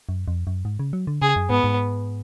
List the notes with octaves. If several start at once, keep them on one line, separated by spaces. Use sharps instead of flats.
F#2
F2
F#2
G#2
C#3
F#3
D3
C#3 G#4
F#2
G#2 B3
G#2